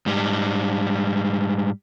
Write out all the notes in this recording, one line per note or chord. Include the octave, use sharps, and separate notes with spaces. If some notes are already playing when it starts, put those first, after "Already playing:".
G#2 G3